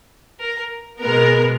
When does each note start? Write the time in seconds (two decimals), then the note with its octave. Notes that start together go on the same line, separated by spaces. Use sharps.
0.41 A#4
1.02 B2 G#3 B3 A#4